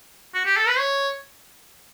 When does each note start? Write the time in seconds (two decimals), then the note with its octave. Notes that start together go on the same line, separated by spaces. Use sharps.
0.35 F#4
0.45 G4
0.57 A4
0.68 B4
0.79 C#5